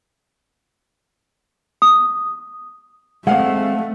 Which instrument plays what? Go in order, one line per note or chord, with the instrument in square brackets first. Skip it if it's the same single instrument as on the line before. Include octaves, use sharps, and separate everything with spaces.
[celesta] D#6
[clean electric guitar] G#3 C4 [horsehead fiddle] A3 [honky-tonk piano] F5 F#5